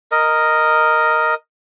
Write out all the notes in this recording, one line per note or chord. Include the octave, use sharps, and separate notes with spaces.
A#4 D#5